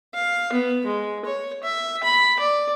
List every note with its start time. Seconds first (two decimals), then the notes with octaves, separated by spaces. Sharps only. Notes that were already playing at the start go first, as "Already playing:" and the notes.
0.14 F5
0.53 B3
0.86 G#3
1.25 C#5
1.63 E5
2.03 B5
2.40 D5